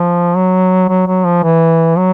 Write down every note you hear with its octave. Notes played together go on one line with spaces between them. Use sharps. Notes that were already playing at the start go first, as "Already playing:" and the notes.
Already playing: F3
F#3
F#3
F#3
F3
E3
F#3